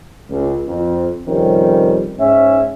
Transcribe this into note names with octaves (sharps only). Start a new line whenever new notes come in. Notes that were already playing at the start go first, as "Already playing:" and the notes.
C#2
F2
F2 C3 D#3 G3 C4 C#4
G#2 C#4 E5